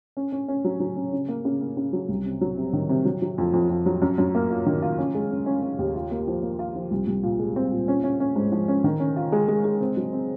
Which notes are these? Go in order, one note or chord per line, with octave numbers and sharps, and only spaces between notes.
C#4
C#4
C#4
F#3
F#3
C#4
C#3
A#3
C#3
A#3
C#3
F#3
C2
C3
F#3
C3
D#3
C3
F#3
F#3
F2
F2
F2
F#3
F#2
F#2
A#3
F4
D#3
F4
C#4
G#3
C#4
C#4
C#4
D#2
F4
A#3
F3
A#3
F4
F3
C2
C2
A#2
G#3
C4
A#2
C#4
C#4
C#4
G#2
F3
C#4
D#3
C#4
F4
G#3
G#3
G#3
C4
F#3
C4